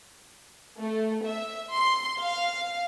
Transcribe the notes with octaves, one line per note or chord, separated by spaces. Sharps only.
A3
E5
C6
F5